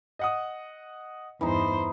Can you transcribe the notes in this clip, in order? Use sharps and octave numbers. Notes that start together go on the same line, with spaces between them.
D#5 F#5 D#6
E2 G2 E3 D#4 C5